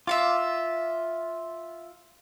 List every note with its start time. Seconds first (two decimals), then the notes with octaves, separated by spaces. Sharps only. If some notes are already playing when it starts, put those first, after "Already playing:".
0.07 F4 E5 F5 D6